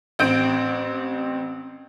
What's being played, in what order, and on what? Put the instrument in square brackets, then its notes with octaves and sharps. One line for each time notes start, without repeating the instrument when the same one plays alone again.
[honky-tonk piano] A1 C4 G6 D7